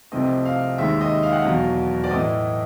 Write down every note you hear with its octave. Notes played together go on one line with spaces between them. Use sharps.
C2 C3 F3 A3 C4 D#5
F5
D#2 D#3 G#3 E5
D#5
F5
F#5
E2 B2 F#3 F5
D5
A2 E3 A3 D#5